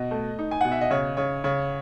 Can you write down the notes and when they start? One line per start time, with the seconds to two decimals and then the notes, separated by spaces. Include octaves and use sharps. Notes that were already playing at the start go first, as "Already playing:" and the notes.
Already playing: B2 D#5
0.11 A3
0.39 D#4
0.51 G#5
0.61 B2 F#5
0.72 E5
0.81 D#5
0.90 C#3 C#5
1.17 C#3 C#5
1.44 C#3 C#5